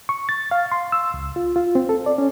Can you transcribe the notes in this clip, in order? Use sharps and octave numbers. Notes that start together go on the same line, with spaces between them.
C#6
A6
F5
C6
E6
C#2
F4
F4
C4
A4
D5
C#4